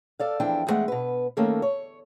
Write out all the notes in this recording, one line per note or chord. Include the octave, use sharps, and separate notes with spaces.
A4 D5 F5
E2 F3 D4 E4 G5
E2 A#2 G#3 A3 F#5
B2 B4
D#3 A3 A#3 C#4 A4
C#5